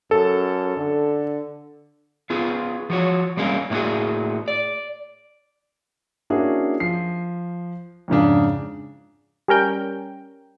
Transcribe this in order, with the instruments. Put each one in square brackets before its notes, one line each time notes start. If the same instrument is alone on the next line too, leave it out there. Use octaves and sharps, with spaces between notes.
[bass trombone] F#2 [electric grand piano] A4
[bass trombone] D3
[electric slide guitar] B3 F4 G#4
F3 F#4 C#5
G3 G#3 A#3 C#4
A2 A#3 C#4 F#4 G#4
D5
[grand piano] A#3 C#4 D4 E4 F#4 G#4
F3 C7
F2 G#2 C#3 D4
[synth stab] G3 C#4 A#4 G5